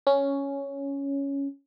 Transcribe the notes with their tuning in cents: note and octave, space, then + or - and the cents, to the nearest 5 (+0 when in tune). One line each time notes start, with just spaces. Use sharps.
C#4 +5